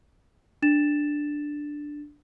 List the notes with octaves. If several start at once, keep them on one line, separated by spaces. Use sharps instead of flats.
D4 A6 E7